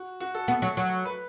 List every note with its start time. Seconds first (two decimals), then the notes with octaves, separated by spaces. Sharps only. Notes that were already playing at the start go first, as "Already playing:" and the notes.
Already playing: F#4
0.20 F#4
0.35 A4
0.48 B3
0.62 F#3
0.77 F#3
1.05 B4